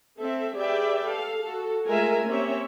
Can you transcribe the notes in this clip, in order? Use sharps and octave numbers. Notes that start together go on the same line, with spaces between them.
C4 A4 E5
G4 G#4 B4 D5 E5 G5
A4 F5
F#4 A4
G#3 A3 F4 A#4 E5 G#5
A#3 C4 C#4 G4 C#5 E5